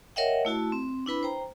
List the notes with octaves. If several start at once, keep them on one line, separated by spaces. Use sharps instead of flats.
A#4 C#5 D#5 E5 F#5 G5
A3 E4 F#4 A5
C4
D4 E4 B4 B5
C5 G5 A#5